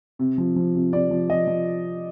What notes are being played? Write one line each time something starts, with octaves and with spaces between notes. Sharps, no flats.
C3
F3
F3
C3
C3 D5
F3
F3 D#5
F3